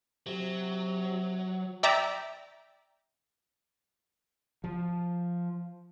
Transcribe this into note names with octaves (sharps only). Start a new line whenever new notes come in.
C3 F#3
D5 E5 G5 A#5 D6
F3